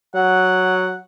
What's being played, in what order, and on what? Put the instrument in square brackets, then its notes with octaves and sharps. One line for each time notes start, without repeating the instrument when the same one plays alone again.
[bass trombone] F#3 [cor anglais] F#5